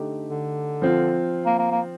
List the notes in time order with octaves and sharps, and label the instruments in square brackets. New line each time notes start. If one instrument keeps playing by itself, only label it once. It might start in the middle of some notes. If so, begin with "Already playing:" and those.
Already playing: [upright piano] D3 A3 D#4 G4
[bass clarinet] D3
[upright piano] F3 C4 F4
[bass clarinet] A#3
A#3
A#3